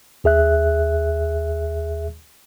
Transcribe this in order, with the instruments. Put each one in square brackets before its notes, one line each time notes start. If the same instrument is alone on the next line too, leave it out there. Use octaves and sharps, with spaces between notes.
[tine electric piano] D#2 G#4 E5 F#6